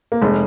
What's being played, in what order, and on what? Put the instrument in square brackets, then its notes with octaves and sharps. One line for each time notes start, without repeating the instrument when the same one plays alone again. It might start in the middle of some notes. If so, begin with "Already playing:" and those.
[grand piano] A#3
[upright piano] F1 [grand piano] G#3